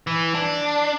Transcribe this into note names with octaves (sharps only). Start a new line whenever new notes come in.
E3
D4